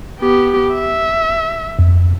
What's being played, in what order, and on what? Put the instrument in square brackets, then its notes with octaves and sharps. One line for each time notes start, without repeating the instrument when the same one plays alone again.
[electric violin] B3 G4
E5
[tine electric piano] F2